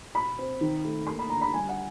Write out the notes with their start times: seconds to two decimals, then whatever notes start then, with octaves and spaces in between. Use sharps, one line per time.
0.15 B2 B5
0.39 C4
0.61 D#3
0.85 A3
1.07 A#3 C6
1.19 B5
1.30 D3 A#5
1.41 B5
1.54 G3 G#5
1.69 F#5